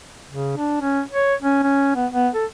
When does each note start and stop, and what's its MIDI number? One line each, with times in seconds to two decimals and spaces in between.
0.31 0.56 49
0.57 0.78 62
0.80 1.02 61
1.11 1.35 73
1.42 1.58 61
1.63 1.94 61
1.95 2.07 59
2.12 2.28 59
2.34 2.45 69